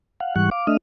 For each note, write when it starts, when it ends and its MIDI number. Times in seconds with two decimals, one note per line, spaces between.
0.20 0.35 77
0.20 0.35 78
0.36 0.50 44
0.36 0.50 52
0.36 0.50 55
0.36 0.50 78
0.36 0.50 85
0.36 0.50 90
0.51 0.67 77
0.51 0.67 86
0.67 0.77 57
0.67 0.77 62
0.67 0.77 75
0.67 0.77 76
0.67 0.77 87
0.67 0.77 89